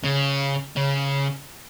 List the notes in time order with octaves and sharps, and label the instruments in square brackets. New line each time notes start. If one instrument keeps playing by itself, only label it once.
[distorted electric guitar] C#3
C#3